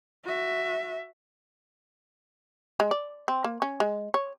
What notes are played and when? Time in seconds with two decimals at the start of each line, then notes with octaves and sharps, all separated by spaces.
0.24 F#4 E5
2.80 G#3
2.91 D5
3.28 C4
3.44 A#3
3.62 C#4
3.80 G#3
4.14 C#5